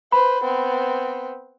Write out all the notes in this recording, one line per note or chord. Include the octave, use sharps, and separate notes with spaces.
B4 C5 B5
B3 C4